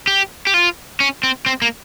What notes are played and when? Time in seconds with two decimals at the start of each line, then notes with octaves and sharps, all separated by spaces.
0.07 G4
0.47 G4
0.54 F4
1.00 C#4
1.23 C4
1.46 C4
1.62 A#3